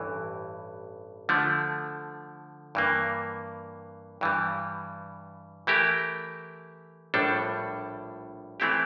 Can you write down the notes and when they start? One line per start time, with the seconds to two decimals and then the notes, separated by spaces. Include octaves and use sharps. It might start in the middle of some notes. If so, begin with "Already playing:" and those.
Already playing: A1 G2 E3
1.29 D3 F3 A3
2.75 G2 E3 A#3
4.21 G2 E3 G3
5.67 E3 A3 E4 G4 A#4
7.14 A#1 A2 G3 D4 A4
8.60 E3 A3 C4 E4 G4